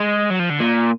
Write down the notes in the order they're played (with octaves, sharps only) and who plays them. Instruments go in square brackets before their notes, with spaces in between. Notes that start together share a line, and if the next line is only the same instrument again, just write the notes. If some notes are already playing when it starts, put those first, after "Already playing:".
Already playing: [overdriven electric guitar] G#3
F#3
F3
D3
A#2